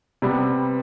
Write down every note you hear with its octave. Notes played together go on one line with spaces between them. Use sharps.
C3 G3 B3